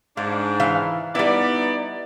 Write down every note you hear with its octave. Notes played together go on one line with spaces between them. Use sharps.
G#2 D4 F5
E3 F5
G3 B3 D#4 E4 D5